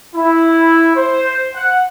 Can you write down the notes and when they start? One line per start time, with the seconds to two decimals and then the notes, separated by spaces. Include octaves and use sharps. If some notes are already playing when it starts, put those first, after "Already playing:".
0.15 E4
0.96 C5
1.54 F#5